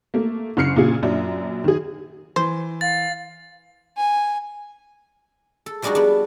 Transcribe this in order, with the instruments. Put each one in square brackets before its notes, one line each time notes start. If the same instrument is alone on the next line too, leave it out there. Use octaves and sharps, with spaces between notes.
[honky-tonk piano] A3 A#3
F#1 C#3 F6 C7 C#7
A#2 C#3 F4 G#4
F#2 A#2 F#3 D4
D#3 G#4
[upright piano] E3 [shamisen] C5
[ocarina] F5 [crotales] A6
[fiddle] G#5
[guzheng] A4
F3 G3 G#3 D4 D#4 F#4
B3 D4